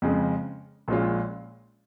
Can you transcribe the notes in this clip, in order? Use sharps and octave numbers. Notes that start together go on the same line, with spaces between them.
F2 C#3 G#3
A#1 A#2 G#3 C#4 F4